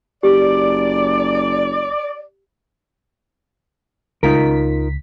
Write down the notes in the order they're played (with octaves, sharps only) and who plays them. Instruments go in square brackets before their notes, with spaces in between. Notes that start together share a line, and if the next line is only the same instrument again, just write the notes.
[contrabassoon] F#1 [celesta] G4 [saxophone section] D5
[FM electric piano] C#2 B6 [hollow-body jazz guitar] D#4 F4 A#4